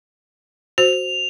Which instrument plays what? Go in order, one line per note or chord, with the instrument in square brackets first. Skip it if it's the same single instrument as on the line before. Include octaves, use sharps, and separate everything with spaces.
[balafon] F#4 C5 [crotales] F7